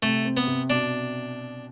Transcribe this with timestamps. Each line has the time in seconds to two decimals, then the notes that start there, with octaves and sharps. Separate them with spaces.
0.02 C3 A3
0.25 C4
0.37 B3
0.47 C3
0.70 B2 D4